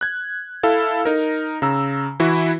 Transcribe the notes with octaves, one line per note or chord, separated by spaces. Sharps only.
F#6 G#6
E4 A4 F5
D#4 A#4
C#3 A#5 E6
E3 E4 F#4 B4